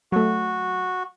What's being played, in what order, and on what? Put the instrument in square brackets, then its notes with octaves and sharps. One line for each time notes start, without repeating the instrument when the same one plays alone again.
[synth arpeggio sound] F#3 A3 [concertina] F#4